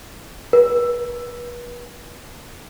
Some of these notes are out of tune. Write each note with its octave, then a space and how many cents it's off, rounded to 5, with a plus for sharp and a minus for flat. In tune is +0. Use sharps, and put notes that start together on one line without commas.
B4 -35